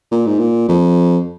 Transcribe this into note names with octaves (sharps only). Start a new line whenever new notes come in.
A#2
G#2
A#2
F2